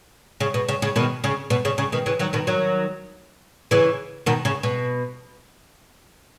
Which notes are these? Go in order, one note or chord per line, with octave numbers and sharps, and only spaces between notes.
C#3
B2
C#3
C#3
B2 D#3
C#3
B2
C#3
C#3
B2 D#3
C#3 E3
D#3 F#3
B2 D#3
D#3 F#3
C#3 E3
B2 D#3
C#3
B2